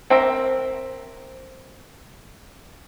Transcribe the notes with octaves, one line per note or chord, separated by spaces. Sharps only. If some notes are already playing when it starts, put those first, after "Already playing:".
C4 A#4 E5